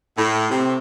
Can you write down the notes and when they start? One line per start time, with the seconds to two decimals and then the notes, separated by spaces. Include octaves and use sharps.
0.17 A2
0.49 C3